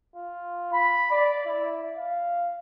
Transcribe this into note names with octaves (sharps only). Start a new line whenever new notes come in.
F4
B5
D5
E4
F5